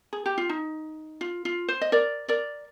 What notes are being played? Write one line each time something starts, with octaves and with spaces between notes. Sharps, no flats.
G#4
G4
F4
D#4
F4
F4
C5
D#5
A#4 D5
A#4 D5